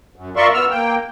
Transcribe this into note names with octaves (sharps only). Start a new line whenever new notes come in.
F#2
F4 A#4 D5 E5 C6 C#6
B3 E6 F6
A#3 G5